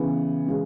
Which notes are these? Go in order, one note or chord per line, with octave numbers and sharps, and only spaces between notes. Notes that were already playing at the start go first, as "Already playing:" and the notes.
Already playing: C#3 E3 B3
C#3 E3 G#3